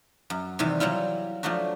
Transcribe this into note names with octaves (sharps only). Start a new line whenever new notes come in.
F#2
C3 D#3 E3 G3
F#3 G3 E4 F4
F3 F#3 A3 D4 F#4